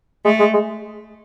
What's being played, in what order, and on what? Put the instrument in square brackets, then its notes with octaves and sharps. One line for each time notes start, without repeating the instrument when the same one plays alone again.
[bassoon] G#3 [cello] A3
[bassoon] G#3
G#3